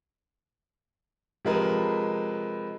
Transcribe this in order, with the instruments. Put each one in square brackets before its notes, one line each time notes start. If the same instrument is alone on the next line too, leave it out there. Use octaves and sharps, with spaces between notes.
[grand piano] C3 F3 G#3 A#4 B4